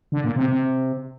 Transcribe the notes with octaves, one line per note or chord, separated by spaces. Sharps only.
D3
A#2
C3
C3